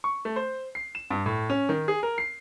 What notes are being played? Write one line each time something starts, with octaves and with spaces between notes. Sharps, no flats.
C#6
A3
C5
C7
E7
G2
A2
C#4
D#3
G#4
A#4
C7